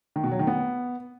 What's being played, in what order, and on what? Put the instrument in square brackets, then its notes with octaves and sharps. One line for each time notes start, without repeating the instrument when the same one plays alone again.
[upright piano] D#3
B2
F#3
D#3
B3